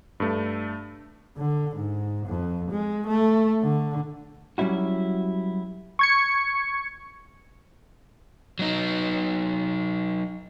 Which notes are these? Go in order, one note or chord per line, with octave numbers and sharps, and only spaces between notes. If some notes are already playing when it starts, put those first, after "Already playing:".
G2 A3
D3
G#2
F2
G#3
A3
D3
F#3 G3 C#4 E4 F#4
C#6 G#6 C#7
F#3 D#4